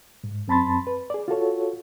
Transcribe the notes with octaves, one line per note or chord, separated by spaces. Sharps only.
G#2
F#2 C4 A5 B5 C6 A6
B4
G#4 D5
F4 F#4 A4 C#5